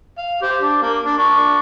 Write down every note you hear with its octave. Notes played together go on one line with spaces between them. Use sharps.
F5
G4 C5
D4
A#3
D4
D4 C#6